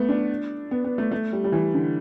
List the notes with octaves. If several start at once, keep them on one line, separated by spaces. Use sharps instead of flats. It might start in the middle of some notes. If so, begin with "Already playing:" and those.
Already playing: A3 B3
D4
B3
B3
A3
A3
G3
G3
E3
D3